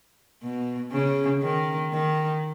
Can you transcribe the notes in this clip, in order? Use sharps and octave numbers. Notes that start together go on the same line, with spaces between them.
B2
C#3
D#3
D#3